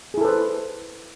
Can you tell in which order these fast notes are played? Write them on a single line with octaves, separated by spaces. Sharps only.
G#4 E4 A4 B4 C5